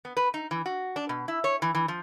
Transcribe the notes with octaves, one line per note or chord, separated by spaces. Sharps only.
B3
B4
D#4
E3
F#4
D4
B2
E4
C#5
E3
E3
F3